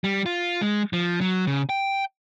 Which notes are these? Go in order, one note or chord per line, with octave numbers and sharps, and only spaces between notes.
G3
F4
G#3
F3
F#3
C#3
G5